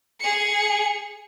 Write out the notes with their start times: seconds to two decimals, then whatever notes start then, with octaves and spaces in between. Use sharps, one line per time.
0.20 G#4 C#7